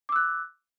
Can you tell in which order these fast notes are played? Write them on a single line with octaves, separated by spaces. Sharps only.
D6 E6 F#6